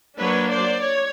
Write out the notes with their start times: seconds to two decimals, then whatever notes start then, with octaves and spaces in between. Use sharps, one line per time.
0.19 F#3 A#3 D4 B4 C#5
0.50 C5 D5
0.82 C#5